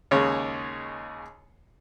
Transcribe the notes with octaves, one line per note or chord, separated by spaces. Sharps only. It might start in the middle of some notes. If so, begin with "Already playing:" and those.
D#2 C#3 G#3 C#5